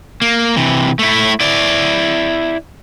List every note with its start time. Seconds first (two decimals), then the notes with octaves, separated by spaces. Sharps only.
0.22 A#3
0.57 C3 E3
0.99 A3 E4
1.40 E4 D5